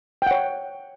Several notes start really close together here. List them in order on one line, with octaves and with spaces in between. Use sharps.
G5 F#5 C#5